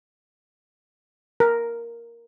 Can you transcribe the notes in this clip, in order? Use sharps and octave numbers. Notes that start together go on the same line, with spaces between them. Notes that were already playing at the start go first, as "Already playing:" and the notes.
A#4